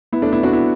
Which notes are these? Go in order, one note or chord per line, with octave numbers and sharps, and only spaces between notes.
B3 E4
A3 D4
B3 E4
D4 F#4
B3 E4